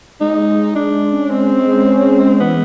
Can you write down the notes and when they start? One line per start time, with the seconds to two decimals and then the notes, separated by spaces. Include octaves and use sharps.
0.20 G#3 D#4
0.38 G#3
0.57 G#3
0.75 G#3 D4
0.93 G#3
1.12 C#4
1.30 G#3 C4
1.49 G#3
1.68 G#3
1.86 C#4
2.04 G#3
2.22 G#3
2.40 E3 B3